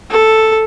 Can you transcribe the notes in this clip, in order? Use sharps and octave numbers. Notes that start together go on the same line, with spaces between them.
A4